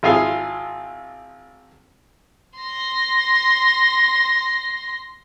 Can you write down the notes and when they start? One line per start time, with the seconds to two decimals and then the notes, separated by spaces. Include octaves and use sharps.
0.03 G#1 E4 F4 G#4 F5 G#5
2.59 C6 A#6